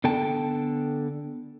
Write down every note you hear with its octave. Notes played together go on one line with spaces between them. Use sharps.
D3 B3 A4 G5 A5